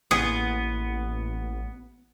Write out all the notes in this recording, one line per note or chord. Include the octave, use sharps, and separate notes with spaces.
A1 A#3 B3 E4 G#4